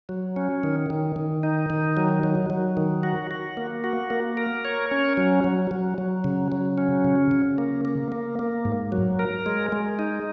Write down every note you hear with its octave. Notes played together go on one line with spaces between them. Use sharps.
F#3
C#4
D#3
D#3
D#3
D#4
D#3
F#3
F#3
F#3
D#3
F#4
F#4
A#3
F#4
A#3
A#4
C#5
C#4
F#3
F#3
F#3
F#3
C#3
F#3
C#4
C#3
C#3
A#3
A#3
A#3
A#3
G#2
F#3
A#4
G#3
G#3
D#4